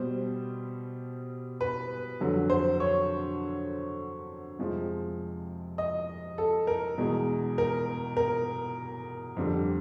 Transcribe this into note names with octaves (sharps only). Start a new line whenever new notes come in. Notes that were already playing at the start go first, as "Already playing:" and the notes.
Already playing: B2 G3 C5
B4
F2 D3 F#3
C5
C#5
F2 C3 F3 G#3
D#5
A4
A#4
E2 B2 G#3
A#4
A#4
F2 D3 G3